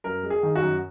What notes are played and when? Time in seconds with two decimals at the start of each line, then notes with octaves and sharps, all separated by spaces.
0.04 F#2 A#4
0.23 G#3
0.30 G#4
0.43 D#3
0.55 F#4
0.62 F#2